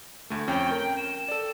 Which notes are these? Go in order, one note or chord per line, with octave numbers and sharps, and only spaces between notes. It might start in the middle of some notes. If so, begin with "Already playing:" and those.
D2 A3
F2 C#4 G5
A#4
E7
A4 D5